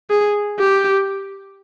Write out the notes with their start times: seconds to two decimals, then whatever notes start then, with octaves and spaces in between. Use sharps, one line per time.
0.10 G#4
0.59 G4